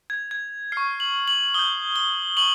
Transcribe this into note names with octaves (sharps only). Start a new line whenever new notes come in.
G#6
G#6
C#6 F6 C7
F#7
F#7
D#6 G6 G7
G7
C#6 F#7